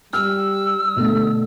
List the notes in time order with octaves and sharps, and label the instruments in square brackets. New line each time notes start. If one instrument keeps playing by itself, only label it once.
[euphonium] G3 [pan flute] E6 [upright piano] F6
[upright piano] B2 A3 [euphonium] D3